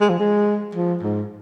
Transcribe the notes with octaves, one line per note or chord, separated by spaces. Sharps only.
G#3
F3
G#3
F3
G#2